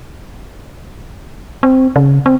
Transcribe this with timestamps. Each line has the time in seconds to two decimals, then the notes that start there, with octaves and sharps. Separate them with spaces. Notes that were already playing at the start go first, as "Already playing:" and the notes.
1.63 C4
1.96 C#3
2.26 C4